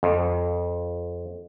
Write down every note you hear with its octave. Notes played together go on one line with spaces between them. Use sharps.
F2